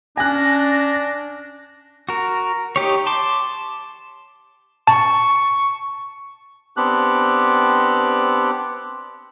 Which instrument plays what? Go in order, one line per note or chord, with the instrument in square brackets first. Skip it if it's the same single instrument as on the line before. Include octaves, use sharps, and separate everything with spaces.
[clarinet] C#4 [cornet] D4 [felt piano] G#5 F#6 [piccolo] A#6
[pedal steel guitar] F#4 A#4
D#4 G4 C#5
A5 C6 D6
[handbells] A5 [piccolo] C#6
[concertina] B3 C4 D4 G4 F#6